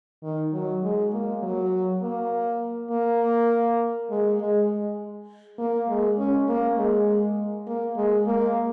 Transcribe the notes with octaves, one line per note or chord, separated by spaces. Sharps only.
D#3
F#3
G#3
A#3
F#3
A#3
A#3
G#3
G#3
A#3
G#3
C#4
A#3
G#3
A#3
G#3
A#3